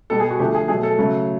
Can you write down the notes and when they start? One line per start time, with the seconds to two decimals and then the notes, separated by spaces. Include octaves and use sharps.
0.10 B2 G3 A4
0.20 G#4
0.30 F#4
0.39 D3 F3 A3 G4
0.54 G#4
0.68 B2 F#3 A3 G#4
0.83 A4
0.98 C#3 F#3 A3